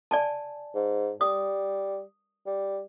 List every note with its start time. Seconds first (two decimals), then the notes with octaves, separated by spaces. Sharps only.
0.11 D5 G#5 A5
0.75 G#2
1.21 G3 D#6
2.46 G3